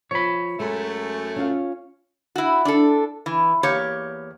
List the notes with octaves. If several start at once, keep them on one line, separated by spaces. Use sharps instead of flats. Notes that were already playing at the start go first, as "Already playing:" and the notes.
F3 C#5 B5
F#2 G#3 A3
C#4 F4 F5
E4 F#4
D4 A4
E3
E2 A#3 G4 C#5